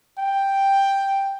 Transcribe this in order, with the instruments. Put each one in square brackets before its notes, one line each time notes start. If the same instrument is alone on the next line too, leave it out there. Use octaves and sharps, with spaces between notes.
[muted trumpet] G5